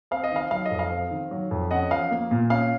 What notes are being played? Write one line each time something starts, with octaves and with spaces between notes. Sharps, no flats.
C4 F5
D#5
D#3 F5
F#3 F5
D#5
F2
F5
C4
D#3
F#3
F2
C#4 D#5 F#5
F3 F5
A#3
A#2
C#4 F5